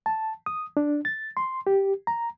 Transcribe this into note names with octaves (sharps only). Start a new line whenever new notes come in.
A5
D#6
D4
A6
C6
G4
A#5